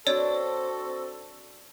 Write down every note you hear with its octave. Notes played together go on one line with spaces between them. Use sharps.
C4 D4 F#4 A4 C#5 D5